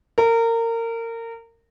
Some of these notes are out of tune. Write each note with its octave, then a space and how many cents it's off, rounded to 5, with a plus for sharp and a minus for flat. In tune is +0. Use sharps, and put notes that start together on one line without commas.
A#4 -25